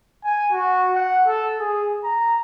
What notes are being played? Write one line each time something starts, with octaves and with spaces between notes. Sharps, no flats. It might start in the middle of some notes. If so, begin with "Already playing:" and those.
G#5
F#4
F#5
A4
G#4
A#5